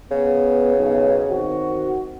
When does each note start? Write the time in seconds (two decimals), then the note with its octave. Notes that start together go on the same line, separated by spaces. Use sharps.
0.11 C#3 B3
0.76 B1
1.29 D#3 C4 F#4